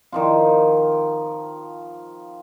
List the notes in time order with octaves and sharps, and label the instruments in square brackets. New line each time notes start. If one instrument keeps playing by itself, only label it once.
[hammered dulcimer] D#3 F3 F4